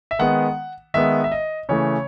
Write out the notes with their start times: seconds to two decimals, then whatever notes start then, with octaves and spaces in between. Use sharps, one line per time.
0.11 E5
0.19 D#3 G#3 B3 F#5
0.94 D#3 G#3 B3 E5
1.24 E5
1.32 D#5
1.69 C#3 E3 A3 C#5